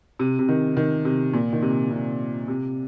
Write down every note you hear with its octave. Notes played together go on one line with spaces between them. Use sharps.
C3
C3
D#3
D#3
C3
A#2
D#3
C3
C3
C3